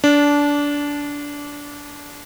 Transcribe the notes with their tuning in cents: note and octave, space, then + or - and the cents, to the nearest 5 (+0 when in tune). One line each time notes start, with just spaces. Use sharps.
D4 -20